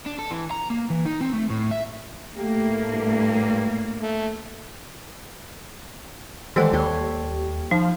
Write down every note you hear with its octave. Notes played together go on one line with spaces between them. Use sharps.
D4
A4
E3
A#5
A#3
E3
D#4
C4
A3
A2
E5
A2 A3 A#3 G4
G2
A3
D#3 E3 G3 G#3 A4 C5 F#5
D#2 G3 C#5 C6
F3 D#4